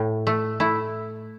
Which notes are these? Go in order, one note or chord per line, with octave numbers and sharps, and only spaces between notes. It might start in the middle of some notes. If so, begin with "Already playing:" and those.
Already playing: A2
A3
A3 E4